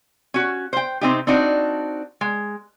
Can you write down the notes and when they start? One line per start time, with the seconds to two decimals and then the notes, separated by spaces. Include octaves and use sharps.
0.34 C#4 F#4
0.73 C5 G5
1.01 C3 C4 D#4 G4
1.27 C4 D4 D#4 F#4
2.21 G#3